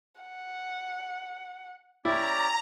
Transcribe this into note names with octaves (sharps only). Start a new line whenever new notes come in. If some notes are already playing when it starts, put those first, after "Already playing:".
F#5
C#4 E4 G4 D5 A#5